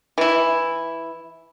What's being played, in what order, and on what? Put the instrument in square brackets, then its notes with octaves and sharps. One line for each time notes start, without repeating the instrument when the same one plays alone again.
[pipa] E3 E4